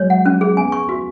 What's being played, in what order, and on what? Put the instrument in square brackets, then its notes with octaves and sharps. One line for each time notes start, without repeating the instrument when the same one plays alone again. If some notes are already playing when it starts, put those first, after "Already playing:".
Already playing: [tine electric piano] F#3 G#3 [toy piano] C#5
[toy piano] F#5
C#4
G#4
[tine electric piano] B3 [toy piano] G#5
[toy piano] C#6
F#4